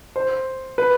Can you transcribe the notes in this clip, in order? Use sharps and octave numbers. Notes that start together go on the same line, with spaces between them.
C5
B4